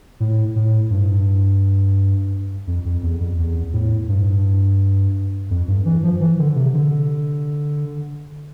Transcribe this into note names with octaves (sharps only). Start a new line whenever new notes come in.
A2
A2
G2
F2
F2
E2
F2
E2
A2
G2
F2
G2
E3
F3
E3
D3
C3
D3